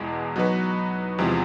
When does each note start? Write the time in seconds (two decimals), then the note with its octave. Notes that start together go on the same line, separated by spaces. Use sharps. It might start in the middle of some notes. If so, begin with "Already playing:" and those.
Already playing: E2 B2 G#3
0.36 F#3 B3 D#4 F#4 B4
1.18 E2 C3 F3 G#3